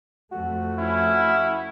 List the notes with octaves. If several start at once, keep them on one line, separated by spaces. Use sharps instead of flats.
F2 A3 F#4
C#4 E4